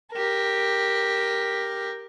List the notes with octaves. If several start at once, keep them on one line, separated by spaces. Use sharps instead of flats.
G4 A#4